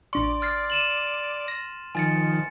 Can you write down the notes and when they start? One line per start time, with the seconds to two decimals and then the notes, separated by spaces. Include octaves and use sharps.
0.13 A1 D4 D5 C6 C#6
0.42 F6 A6 C7
0.70 D#7 E7 F#7
1.48 A#6
1.95 D#3 F3 G#5 A6 C#7